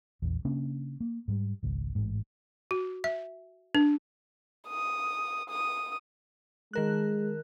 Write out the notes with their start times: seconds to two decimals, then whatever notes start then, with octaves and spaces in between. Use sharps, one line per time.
0.22 A#1 E2
0.45 C#3 A#3 C#4 D4
1.00 A#3
1.28 G#2 G3
1.63 G#1 C#2
1.95 A1 G#2
2.71 F#4
3.04 E5
3.75 D4
4.68 D#6
5.49 D#6
6.73 D#3 G#3 A#4 F#6